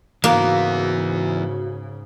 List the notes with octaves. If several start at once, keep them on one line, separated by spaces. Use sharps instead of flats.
G#2 C#3 E3 A#3 B3 F#4